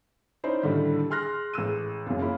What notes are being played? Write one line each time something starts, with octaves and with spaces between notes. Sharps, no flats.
C#4 D#4 E4 C5 D5
A2 D3 D#3 G3 E4
G#4 C6 F6 F#6 A#6
A1 G#3 E6 D#7
C#2 F#2
A#3 C#4 E4 F4